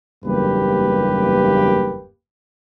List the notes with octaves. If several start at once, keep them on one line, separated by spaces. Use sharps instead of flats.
F#1 E2 G2 A#3 G4 B4